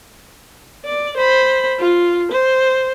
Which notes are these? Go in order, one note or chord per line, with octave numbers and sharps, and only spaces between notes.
D5
C5 B5
F4
C5